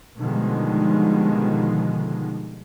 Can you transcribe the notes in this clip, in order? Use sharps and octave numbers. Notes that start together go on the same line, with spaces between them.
B2 D3 D#3 F3 G3 G#3